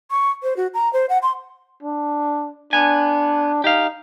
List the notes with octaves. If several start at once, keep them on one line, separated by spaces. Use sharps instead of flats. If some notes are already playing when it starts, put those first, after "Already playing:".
C#6
C5
F#4
A#5
C5
F#5
C6
D4
B3 D4 G#5
D#4 G4 F5